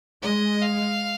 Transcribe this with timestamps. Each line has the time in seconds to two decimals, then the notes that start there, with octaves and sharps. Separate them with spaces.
0.22 G#3 D#5
0.62 F5